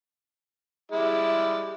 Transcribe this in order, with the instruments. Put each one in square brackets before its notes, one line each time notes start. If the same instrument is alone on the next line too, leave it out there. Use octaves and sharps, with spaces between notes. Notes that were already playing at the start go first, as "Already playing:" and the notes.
[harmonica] G3 G#3 E4